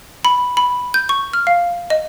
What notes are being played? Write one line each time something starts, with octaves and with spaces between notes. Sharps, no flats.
B5
B5
G6
C#6
F6
F5
D#5